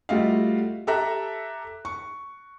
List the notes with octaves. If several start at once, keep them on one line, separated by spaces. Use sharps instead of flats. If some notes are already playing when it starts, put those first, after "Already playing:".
G3 A3 F4 F#4 D#5 F5
G4 A4 E5 A#5 F#6
C#6